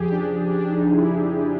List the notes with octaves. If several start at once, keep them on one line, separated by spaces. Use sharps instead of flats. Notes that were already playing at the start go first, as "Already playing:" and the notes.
Already playing: F2 C#3 F3 G4 G#4
D4
D4
D4
D4
D#4
E4